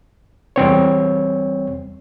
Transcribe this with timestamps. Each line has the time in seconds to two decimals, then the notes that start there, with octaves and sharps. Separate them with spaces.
0.56 E2 G3 C4 C#5